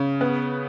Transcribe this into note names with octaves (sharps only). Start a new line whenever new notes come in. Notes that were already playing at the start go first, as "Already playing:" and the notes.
Already playing: C#3
B3